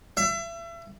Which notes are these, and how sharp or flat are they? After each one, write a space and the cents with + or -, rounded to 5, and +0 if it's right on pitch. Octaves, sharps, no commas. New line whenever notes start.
E5 +35